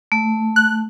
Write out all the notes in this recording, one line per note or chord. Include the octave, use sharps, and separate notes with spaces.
A3
F#6